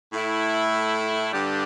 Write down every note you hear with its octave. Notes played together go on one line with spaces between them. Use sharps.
A2 A3 E4
G2 D3 G3 D4 G4